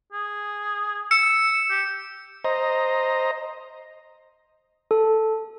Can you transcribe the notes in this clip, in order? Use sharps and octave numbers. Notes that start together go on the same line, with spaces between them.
G#4
E6 C#7
G4
C5 D#5 A#5
A4